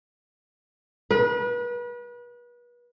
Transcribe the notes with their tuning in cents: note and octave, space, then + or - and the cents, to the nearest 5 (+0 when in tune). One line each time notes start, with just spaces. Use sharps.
B4 -35